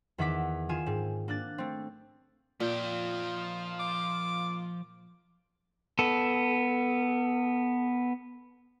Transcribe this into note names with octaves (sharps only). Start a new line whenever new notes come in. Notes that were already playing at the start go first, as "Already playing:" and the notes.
E2 D#3 E5 F#5 D6 B6
D#3 F4 G#5 E7
G#2 C4
A#3 D4 F#6 A6
A3 C4
A#2 F3 A#3 D#4 F4 G5
D6
B3 A4